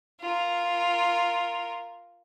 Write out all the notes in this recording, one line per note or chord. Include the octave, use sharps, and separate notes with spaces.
F4 A#4